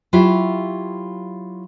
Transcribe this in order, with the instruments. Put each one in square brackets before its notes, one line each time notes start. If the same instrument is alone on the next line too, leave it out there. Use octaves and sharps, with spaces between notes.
[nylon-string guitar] F#3 E4 F4 G4 E5 F5